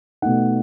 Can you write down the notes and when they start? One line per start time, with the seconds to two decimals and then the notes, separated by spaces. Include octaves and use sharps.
0.22 B2 A3 D#4 F#5